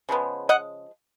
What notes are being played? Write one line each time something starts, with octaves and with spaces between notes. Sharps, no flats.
C#3 F3 G#3 B3
D#5 F#5